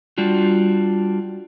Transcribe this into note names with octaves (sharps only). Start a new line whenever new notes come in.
G3 D4 F4 F#4